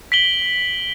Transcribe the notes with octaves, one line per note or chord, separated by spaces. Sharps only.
B6 D7 F#7 G7